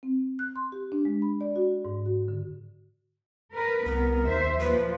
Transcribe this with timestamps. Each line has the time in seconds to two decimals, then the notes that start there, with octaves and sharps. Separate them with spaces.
0.03 C4
0.39 F#6
0.56 C6
0.72 G4
0.92 D4
1.05 G#3
1.22 B5
1.41 D5
1.56 F#4
1.85 G#2
2.06 F#4
2.28 D3
3.54 A#4 B4
3.86 C2 B3 A#4
4.26 D#2 C5 E5
4.60 A#2 F3 B4